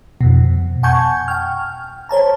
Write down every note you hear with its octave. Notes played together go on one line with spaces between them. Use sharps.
F2 B2
F#5 G#5 A5 C#6 G6 G#6
G5 F6
C5 C#5 A5 A#5